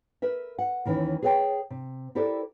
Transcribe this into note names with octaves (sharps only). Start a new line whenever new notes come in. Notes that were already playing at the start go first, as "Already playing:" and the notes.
A#4 B4 E5
F#5
D#2 D#3 E3 C#4
G#4 B4 C#5 F5 G5 A5
C3
E4 G4 A4 A#4 C5 D5